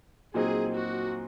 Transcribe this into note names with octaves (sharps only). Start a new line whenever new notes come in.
A#2 F#3 C4 D#4 G#4
F#4